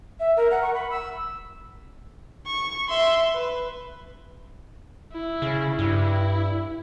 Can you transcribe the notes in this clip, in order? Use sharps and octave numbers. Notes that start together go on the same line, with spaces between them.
E5
A#4
F#5
C#6
B5
E6
C#6
E5 C6
B4
E4
C#3
G2 E4